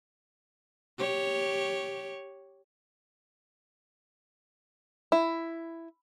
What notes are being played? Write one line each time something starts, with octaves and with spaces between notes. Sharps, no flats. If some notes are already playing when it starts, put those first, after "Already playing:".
G4 C#5
E4